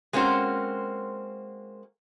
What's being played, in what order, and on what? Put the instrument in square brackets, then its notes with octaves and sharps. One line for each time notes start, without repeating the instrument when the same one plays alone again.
[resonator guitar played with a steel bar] G#3 A#3 C4 C#4 F#4 C5